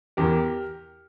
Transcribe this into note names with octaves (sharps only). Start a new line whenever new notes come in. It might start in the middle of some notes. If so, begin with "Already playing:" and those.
E2 E3 G4 A#4